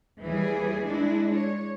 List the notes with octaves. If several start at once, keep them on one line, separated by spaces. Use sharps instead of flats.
D#2 E3 G3 G#4
G#3 D4 E4
C#5